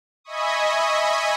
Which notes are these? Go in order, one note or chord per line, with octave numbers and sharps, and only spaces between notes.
D#5 E5 G#5 B5 C#6 D#6